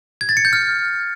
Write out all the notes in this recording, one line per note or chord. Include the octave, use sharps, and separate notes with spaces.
G#6
A6
C#7
G6
F6